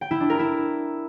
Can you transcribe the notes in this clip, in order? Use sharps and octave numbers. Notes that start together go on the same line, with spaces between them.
G5
E4
D4
A#4
E4